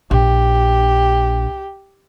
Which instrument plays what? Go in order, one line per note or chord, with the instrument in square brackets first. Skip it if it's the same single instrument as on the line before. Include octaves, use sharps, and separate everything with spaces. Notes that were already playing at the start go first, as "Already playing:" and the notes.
[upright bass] A#1 [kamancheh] G4